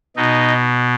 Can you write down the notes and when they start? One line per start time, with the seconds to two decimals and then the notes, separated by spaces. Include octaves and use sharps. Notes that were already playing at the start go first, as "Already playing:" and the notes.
0.16 B2 D#4